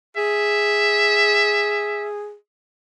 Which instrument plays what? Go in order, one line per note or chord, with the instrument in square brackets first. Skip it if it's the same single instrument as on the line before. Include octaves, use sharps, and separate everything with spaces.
[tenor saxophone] G#4 [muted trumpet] E5